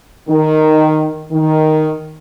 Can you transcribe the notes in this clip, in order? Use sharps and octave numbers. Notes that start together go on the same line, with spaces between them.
D#3
D#3